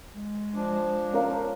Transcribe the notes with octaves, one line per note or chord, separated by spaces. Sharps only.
G#3
F3 D4
C#4 A#4 F5